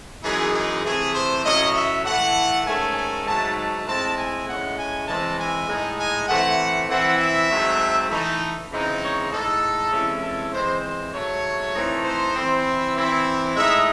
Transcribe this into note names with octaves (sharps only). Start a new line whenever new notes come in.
F#2 E3 G#3 D#4 G#4
G#4
C3 E3 A3 G#4
C5
A2 F#3 C#4 D#5
E5
A2 E3 A3 F#5
G#2 D#3 A3 C#4 G#5
G#5
G#2 F#3 A3 D#4 A5
A5
A2 G#3 C4 E4 A5
G#5
A2 G#3 C#4 F#5
G#5
E3 G#3 C4 E4 A5
G#5
A2 G#3 D#4
G#5
E3 A3 C4 F#5
E3 C4 E4 F#5
E5
G#2 F#3 A3 C4
E3 A3 D#4
C#3 E3 G#3 C4 D#4
C#5
A2 G#3 D#4 A4
C3 E3 G#3 C#4 E4
A4
E3 G#3 C4 C5
C5
G#2 F#3 A3 C#5
E3 A3 C4 D#4
C5
E3 C4 E4
E3 C4 E4
A2 G#3 D#4 E5